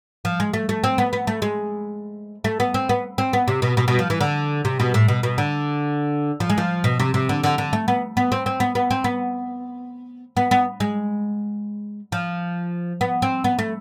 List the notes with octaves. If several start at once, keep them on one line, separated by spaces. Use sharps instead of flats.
F3
G#3
A3
A3
C4
B3
B3
A3
G#3
A3
B3
C4
B3
C4
B3
C3
B2
B2
B2
F3
E3
D3
C3
B2
A2
B2
B2
D3
F3
G#3
F3
B2
C3
C3
D3
D3
D3
A3
B3
B3
C4
C4
B3
B3
C4
B3
B3
B3
G#3
F3
B3
C4
B3
A3